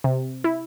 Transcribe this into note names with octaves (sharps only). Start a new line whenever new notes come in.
C3
E4